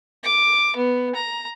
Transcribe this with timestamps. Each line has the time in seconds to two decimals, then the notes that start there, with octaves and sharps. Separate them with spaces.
0.24 D6
0.76 B3
1.15 A#5